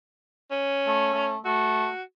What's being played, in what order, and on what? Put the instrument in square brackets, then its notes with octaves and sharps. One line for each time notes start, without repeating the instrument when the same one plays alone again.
[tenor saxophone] C#4
[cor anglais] A3
A3
[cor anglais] A3 [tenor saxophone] F#4